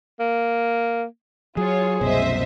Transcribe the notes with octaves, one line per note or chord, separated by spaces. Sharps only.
A#3
F#3 F4 G#4 C#5
C2 F#2 B2 C5 D#5 E5